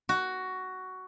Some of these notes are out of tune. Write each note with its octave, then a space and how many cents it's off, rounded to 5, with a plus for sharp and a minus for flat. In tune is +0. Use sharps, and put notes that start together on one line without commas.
F#4 +10